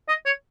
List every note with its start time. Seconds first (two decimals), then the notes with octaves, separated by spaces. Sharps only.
0.09 D#5
0.26 C#5